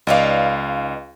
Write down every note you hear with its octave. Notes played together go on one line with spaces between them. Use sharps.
C#2 D#4 B4 D5 F5